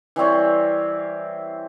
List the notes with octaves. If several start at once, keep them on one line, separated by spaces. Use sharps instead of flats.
E3 G3 C4 C#5